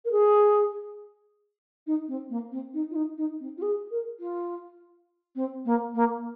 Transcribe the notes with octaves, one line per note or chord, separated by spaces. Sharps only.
A#4
G#4
D#4
C4
A#3
C4
D#4
F4
D#4
D#4
C4
F4
G#4
A#4
F4
C4
A#3
A#3